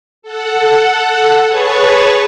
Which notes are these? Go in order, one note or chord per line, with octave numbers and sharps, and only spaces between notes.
A4 F#5
G#4 B4 C#5 A5 C#6